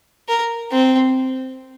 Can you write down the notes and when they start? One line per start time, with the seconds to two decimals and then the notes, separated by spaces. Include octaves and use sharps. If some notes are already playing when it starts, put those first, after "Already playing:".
0.28 A#4
0.71 C4